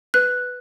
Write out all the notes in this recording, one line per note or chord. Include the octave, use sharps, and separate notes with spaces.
B4 F#6